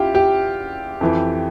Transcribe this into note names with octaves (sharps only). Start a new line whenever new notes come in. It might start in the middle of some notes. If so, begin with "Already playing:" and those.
Already playing: E2 E4 F4 G4
G4
F2 E3